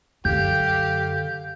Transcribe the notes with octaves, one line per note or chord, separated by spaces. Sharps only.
F#2 D3 G4 F5 G6